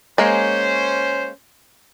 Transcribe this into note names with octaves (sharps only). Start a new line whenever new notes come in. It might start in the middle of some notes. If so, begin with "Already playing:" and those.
G#3 A#3 C#4 C5